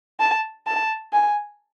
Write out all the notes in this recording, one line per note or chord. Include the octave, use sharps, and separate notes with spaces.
A5
A5
G#5